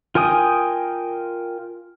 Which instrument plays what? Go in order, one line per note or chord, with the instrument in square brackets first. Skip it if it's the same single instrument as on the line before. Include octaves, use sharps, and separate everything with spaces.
[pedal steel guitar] F4 A#4 G5 G#5 D#6